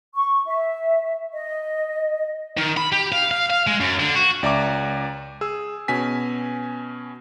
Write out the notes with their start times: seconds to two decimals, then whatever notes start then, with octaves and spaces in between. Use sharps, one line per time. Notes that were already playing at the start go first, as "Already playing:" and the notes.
0.14 C#6
0.46 E5
1.34 D#5
2.57 D#3
2.77 B5
2.92 G4
3.12 F5
3.31 F5
3.50 F5
3.67 G#3
3.80 F#2
4.00 D3
4.16 F#4
4.43 C#2 D5 E5 A#5 D6
5.41 G#4 E6
5.88 B2 C#4 G#5 B6